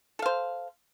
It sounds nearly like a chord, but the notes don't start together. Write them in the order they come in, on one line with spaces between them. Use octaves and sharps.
A4 F5 C5